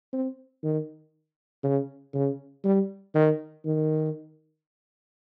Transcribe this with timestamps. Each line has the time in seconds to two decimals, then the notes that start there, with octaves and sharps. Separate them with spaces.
0.13 C4
0.63 D#3
1.64 C#3
2.14 C#3
2.64 G3
3.15 D#3
3.65 D#3